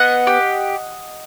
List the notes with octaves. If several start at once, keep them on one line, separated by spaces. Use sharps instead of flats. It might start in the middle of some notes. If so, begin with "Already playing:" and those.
Already playing: B3 D#5 F#5
G4